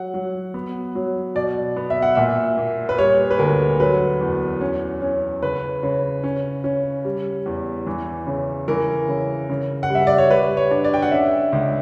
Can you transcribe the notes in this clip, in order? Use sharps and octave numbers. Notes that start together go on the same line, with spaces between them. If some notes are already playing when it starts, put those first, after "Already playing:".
Already playing: F#3 F#5
F#3
B3
F#3
B2 D5
B3
E5
F#5
A#2 E5
A#3
B4
G3 C#5
B4
D2 A#4
F#3 B4
E2
C#4
C#4
C#3 B4
C#3
C#4
C#4
G3
E2
E3
C#3
E3 A#4
C#3
C#3
F#5
G3 E5
D5
C#5
G3 B4
C#5
D4
D5
G5
F#5
C#4 E5
C#2